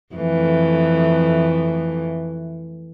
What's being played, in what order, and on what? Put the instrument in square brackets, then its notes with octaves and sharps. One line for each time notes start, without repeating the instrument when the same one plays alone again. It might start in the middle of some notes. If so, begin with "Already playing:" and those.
[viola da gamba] F2 E3 A3